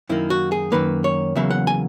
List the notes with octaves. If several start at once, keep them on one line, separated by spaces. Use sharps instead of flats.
F#2 D#3 A#3 E4
F#4
G#4
F#2 D#3 A#3 B4
C#5
E2 C#3 F#3 A#3 E5
F#5
G#5